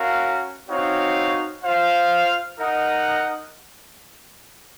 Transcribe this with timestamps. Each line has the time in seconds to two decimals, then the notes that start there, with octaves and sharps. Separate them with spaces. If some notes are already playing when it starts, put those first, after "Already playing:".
Already playing: C#4 F#4 A#4 F5
0.67 C4 D#4 F#4 C#5 F5
1.62 F4 C5 F5
2.58 D#4 A#4 D#5 F#5